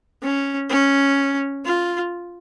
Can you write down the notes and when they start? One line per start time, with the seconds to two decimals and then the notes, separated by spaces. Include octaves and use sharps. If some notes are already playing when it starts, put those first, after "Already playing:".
0.23 C#4
0.70 C#4
1.65 F4